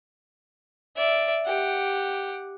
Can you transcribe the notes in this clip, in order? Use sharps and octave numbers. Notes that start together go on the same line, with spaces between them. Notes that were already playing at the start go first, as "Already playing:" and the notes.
D5 E5
G4 F#5